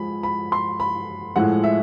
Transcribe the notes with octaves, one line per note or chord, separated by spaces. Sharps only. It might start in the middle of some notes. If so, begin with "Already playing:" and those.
Already playing: F3 G#3 B5
B5
C6
B5
A2 F3 G#3 F#5
E5